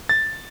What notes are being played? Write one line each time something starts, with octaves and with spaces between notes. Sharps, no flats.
A6